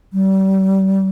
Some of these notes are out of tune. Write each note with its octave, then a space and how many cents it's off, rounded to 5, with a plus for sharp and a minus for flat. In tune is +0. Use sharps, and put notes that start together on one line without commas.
G3 -35